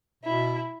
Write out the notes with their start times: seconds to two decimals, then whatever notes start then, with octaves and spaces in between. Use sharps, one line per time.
0.24 B2 E4